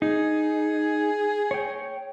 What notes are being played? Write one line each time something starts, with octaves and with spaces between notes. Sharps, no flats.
D#4 G#4
C#5 G5